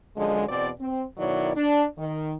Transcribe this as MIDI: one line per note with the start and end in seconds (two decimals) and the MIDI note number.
0.16 0.45 42
0.16 0.45 50
0.16 0.45 53
0.16 0.45 56
0.49 0.69 40
0.49 0.69 47
0.49 0.69 60
0.49 0.69 74
0.80 1.04 60
1.17 1.51 47
1.17 1.51 51
1.17 1.51 54
1.17 1.51 64
1.17 1.51 73
1.17 1.51 74
1.56 1.83 62
1.97 2.34 51